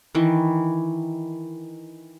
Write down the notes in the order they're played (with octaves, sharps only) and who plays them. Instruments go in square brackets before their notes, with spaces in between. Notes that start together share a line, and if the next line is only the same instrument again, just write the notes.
[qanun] D#3 E3